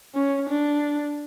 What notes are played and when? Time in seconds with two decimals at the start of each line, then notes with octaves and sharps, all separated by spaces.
0.14 C#4
0.49 D4